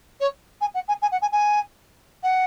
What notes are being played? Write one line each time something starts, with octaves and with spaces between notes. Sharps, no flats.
C#5
G#5
F#5
G#5
G#5
F#5
G#5
G#5
F#5